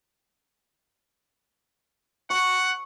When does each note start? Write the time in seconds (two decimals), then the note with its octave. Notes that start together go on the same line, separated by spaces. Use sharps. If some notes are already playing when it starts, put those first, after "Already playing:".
2.30 F#5 C#6